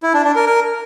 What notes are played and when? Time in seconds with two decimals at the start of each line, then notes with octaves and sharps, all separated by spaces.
0.03 E4
0.14 D4
0.25 D4
0.36 A#4
0.47 A#4